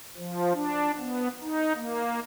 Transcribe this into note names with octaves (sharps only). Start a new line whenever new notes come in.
F3
D4
B3
D#4
A#3